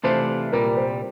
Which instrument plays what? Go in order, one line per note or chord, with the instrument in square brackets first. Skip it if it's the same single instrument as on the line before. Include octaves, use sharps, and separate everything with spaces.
[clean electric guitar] C3 E3 A3 D4 F4 [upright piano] C5
[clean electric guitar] C2 A#2 G3 [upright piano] A#4
[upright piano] C5